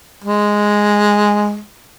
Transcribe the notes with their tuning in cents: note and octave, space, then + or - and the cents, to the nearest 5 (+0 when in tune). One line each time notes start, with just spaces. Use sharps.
G#3 -5